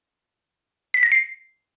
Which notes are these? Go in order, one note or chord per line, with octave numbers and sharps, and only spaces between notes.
B6
A#6
C7